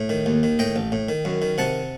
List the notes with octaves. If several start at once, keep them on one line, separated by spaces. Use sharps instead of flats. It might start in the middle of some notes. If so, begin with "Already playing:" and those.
Already playing: A2
D#3
D#2
D#3
A2 D#5 G5
A1
A2
D#3
F#2
D#3
C3 F#5 A5